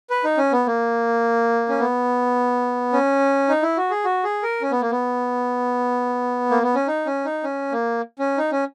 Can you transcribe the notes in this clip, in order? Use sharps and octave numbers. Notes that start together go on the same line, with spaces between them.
B4
D#4
C#4
B3
A#3
C#4
B3
C#4
D#4
E4
F#4
G#4
F#4
G#4
A#4
C#4
B3
A#3
B3
A#3
B3
C#4
D#4
C#4
D#4
C#4
A#3
C#4
D#4
C#4